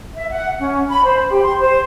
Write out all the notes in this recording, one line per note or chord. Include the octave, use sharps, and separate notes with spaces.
E5
F#5
C#4
B5
C5
G4
C6
C5